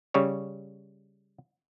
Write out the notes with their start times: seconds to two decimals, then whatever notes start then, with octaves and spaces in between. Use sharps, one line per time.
0.14 C#3 G3 C#5